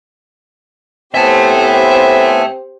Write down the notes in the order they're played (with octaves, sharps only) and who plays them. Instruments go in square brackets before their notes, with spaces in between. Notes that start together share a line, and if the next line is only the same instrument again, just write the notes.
[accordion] A2 B3 G#5 [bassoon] C4 [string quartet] G4 C5 [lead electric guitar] E5 A5